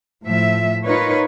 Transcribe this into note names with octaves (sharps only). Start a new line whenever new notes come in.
A2 F3 E5
D#4 F4 A#4 B4 C#5